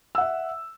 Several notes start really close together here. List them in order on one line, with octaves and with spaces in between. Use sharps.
E6 F#5 E5